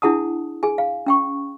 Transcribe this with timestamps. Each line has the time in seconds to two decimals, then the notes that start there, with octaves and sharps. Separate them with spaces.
0.02 D4 E4 G#4 F#5 A5 D#6
0.63 G#4 G#5
0.78 F5
1.07 C#4 G5 C#6